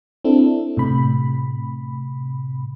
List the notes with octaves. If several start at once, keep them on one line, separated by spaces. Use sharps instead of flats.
C4 D4 E4 A4
A2 C3 B5